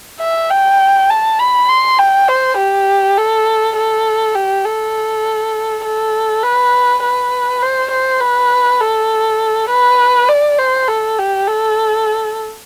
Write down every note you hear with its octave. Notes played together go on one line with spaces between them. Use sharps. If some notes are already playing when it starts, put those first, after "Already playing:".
E5
G5
A5
B5
C6
G5
C5
G4
A4
A4
G4
A4
A4
B4
B4
C5
C5
B4
A4
B4
D5
C5
A4
G4
A4